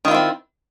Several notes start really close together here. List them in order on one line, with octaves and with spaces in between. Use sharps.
D#3 F4 E4 C4